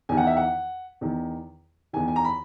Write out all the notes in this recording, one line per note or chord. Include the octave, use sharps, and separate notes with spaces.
E2 D#3 G#5
F#5
E5
F#5
E2 D#3
E2 D#3 G#5
G#5
A#5
B5